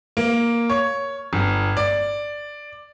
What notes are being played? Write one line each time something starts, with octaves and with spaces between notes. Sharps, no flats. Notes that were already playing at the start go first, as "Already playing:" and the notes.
A#3
C#5
G1
D5